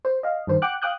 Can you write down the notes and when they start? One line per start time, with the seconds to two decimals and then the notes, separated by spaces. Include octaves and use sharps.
0.05 C5
0.23 D#5 F5
0.47 G2 D#3 C5
0.62 F#5 G5 D6 F#6
0.82 F5 G5 D6 D#6 F#6 G6